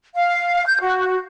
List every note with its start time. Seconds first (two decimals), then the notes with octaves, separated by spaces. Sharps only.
0.14 F5
0.66 G6
0.81 F#4